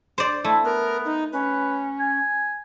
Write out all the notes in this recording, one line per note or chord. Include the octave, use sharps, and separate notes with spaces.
C5 D5
A3 E4
B3 A#4
D#4
C#4 B4
G#5